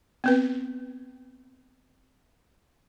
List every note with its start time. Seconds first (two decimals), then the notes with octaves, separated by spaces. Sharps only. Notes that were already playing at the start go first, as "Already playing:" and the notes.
0.24 B3 C4 B4